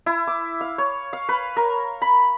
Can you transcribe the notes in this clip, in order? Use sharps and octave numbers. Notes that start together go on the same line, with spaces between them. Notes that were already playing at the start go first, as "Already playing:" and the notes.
E4
D6
F5
C#5
F5
B4
A#4
B5